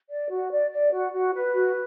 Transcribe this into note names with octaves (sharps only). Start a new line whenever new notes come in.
D5
F#4
D5
D5
F#4
F#4
B4
F#4